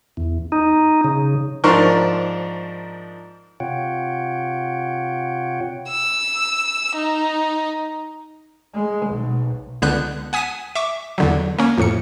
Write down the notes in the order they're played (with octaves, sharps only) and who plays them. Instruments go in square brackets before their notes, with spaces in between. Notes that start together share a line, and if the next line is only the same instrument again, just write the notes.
[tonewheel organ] E2
D#4
C#3
[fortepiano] G#2 F3 D4 A#4 C6 C#6
[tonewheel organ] C3 F4 C#5 F#5 G5
[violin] E6
D#4
[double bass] G#3
B1
[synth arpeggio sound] C#2 D3 B3 F#6 G6
F#5 G#5 D#6 B6 D#7 E7
E5 C#6 D6
E2 D3 F#3
A#3 C#4
F2 A2 C#7